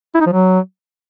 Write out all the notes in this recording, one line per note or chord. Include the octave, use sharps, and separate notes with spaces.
E4
D#4
F3
F#3